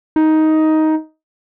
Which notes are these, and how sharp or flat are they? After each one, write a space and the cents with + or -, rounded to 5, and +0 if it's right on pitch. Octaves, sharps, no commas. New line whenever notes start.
D#4 +10